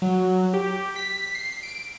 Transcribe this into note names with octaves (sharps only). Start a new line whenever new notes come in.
F#3
G4
B6
C7
D7